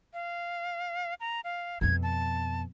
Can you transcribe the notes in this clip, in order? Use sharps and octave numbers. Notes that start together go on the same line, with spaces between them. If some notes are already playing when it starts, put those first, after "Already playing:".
F5
A#5
F5
F2 B2 G#6
A5